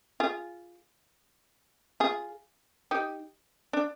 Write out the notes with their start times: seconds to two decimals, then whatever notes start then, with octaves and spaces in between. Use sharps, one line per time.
0.20 F4 G#4
2.00 F4 G#4
2.91 D#4 G4
3.73 D4